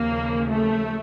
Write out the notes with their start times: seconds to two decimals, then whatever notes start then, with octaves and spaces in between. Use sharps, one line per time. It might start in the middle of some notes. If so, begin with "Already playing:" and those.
Already playing: D#2 C#3 F3 A#3
0.48 A3